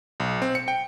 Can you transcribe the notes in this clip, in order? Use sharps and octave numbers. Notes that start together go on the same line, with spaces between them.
B1
C4
C#7
G5